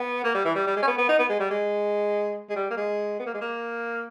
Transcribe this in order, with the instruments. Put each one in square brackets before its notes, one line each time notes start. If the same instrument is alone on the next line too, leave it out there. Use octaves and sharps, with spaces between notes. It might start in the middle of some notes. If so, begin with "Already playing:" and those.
Already playing: [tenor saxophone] B3
A#3
G3
E3
G3
G3
G#3
C#4
B3
B3
D#4
B3
G#3
G3
G#3
G#3
G3
A#3
G#3
B3
A#3
G#3
A#3